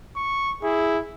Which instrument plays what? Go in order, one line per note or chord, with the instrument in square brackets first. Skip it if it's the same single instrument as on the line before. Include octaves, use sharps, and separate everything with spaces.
[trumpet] C#6
[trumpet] E4 [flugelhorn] G#4